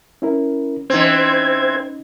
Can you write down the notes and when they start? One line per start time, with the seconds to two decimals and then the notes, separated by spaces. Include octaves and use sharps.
0.22 C#4 E4 A#4
0.90 E3 C4 C#4 D#4 C5 G#6